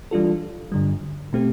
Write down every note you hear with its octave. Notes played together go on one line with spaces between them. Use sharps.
E3 G3 D4 F4 A4
G2 D3 G3
B2 A3 C4 G4